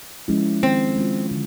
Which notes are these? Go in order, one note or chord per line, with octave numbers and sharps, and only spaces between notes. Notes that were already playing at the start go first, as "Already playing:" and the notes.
F3 G#3 C#4 E4
D#3 C4
G#3 C#4 F4
D3